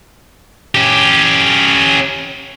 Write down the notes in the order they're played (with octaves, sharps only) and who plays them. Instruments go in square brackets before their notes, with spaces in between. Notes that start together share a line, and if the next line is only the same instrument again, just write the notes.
[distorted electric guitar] C#4 G4